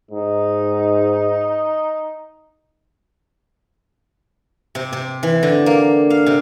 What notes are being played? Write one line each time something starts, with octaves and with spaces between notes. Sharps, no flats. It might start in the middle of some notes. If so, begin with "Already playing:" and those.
G#2 D#4
C3
C3
E3
D3
A#3
F5
C3